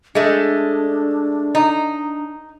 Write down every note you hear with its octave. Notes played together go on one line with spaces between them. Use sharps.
G#3 A3 D4
D#4